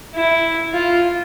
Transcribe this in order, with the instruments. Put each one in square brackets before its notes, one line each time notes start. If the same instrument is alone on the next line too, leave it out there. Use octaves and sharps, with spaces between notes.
[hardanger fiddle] E4
F4